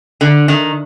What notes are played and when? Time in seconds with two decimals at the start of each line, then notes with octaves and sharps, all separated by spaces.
0.21 D3
0.48 D#3